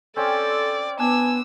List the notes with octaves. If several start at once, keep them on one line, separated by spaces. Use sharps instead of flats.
C4 C#4 A4 D5 F5
B3 D4 G#5 E6